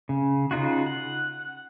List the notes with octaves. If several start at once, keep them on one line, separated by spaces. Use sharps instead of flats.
C#3
C#3 D#4 F4 F#4
F#5